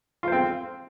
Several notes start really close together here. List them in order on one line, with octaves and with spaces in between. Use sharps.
F4 C5 C4